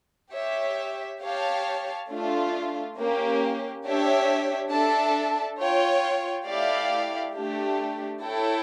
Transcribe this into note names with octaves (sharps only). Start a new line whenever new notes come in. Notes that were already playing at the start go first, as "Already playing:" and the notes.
G4 C#5 E5
G4 C#5 F5 A5
A3 D4 F4
A#3 C#4 G4
D4 G4 C#5 E5
D4 A4 E5 A5
F4 C#5 G5
A3 E4 G4 D5 F5
A3 D4 G4
E4 A4 C#5 G5